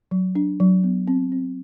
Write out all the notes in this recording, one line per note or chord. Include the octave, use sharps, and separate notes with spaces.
F#3
D4
F#3
B3
C4
C4